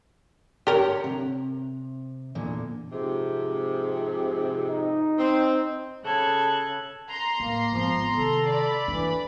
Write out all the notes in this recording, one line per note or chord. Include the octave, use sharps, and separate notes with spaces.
D3 G4 A#4 C#5 F#5
C3
E2 A#2 D3
F2 G#2 C3
D#4
C4
C#3 A4 F#6 G#6
A#5 C6
A2 A#3
G#1 F3 B3
C3 D#3 A4
D5 B5
E3 D4